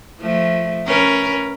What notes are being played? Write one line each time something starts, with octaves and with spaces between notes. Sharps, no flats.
F3 A3
C#4 A#4 B4